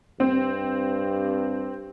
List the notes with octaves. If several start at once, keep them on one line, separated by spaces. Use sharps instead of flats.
G2 C4